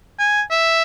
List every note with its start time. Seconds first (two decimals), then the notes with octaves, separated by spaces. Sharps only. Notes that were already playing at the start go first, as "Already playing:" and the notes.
0.19 G#5
0.51 E5